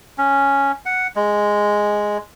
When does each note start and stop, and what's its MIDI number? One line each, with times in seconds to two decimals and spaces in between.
0.18 0.72 61
0.86 1.07 78
1.16 2.18 56